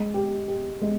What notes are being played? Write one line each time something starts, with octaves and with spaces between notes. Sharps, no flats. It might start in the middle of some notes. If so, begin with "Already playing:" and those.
Already playing: G#3
G4
G4
G#3